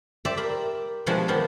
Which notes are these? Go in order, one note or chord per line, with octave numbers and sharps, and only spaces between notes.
G4 C5 D5 E5
A#4 D5 B5
B2 E3 F3 G#3 D4 G4
D#3 F3 B3 G4 A#4